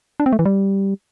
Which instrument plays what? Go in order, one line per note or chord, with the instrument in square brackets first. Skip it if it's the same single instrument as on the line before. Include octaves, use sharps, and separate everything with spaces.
[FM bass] D4
C4
A3
E3
G3